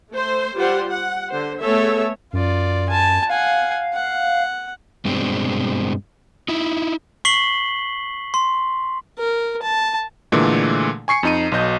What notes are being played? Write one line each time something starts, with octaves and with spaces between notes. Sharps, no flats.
A3 C5
G3 F4 C5 F#5
F#5
D3 C5
A3 B3 G#4 A4 C#5 E5
F#2 F4 D5
G#5 A5
F5 F#5 G#5
F#5
G2 B2 G#3 C4 D4
D#4 E4
C#6 B6 C7 F#7 G7
C6
A#4
A5
A#2 D3 E3 G#3 A3
G#5 C#6 C7 C#7
F2 D#4 D#7
B1 B2 D#5 G6